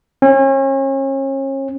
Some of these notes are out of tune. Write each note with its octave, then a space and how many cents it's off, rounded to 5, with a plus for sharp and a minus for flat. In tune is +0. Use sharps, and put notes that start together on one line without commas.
C#4 -35